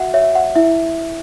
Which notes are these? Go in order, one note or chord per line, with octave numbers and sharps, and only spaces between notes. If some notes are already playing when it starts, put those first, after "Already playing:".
Already playing: F#4 E5 F#5
C#5 E5
F#5
E4 E5